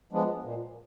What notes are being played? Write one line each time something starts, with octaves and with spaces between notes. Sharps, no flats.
F3 G#3 B3 D4
A#2